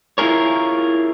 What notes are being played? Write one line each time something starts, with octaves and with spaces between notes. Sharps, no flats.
E4 F4 G#4 A#4 C#5